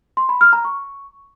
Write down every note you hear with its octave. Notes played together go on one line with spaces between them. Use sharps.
C6
B5
F6
A#5
C#6